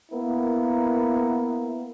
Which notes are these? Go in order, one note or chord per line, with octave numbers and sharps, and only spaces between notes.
A#3 B3 E4 A#4